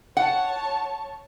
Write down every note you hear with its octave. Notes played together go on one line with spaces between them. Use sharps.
C#5 F#5 A5